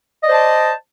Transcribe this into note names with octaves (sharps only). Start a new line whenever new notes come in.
C5 D5 D#5 A5